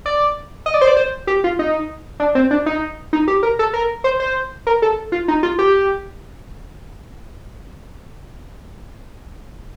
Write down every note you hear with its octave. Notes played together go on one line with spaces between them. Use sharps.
D5
D#5
D5
C5
D5
C5
G4
F4
D#4
D4
C4
D4
D#4
D#4
G4
A#4
A4
A#4
C5
C5
A#4
A4
F4
D#4
F4
G4